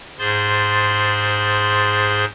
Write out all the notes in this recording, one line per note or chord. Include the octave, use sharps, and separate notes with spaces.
G#2 G#4 C5 C6 A6